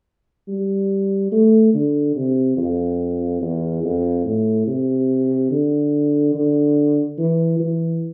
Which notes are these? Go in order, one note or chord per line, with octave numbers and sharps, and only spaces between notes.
G3
A3
D3
C3
F2
E2
F2
A2
C3
D3
D3
E3
E3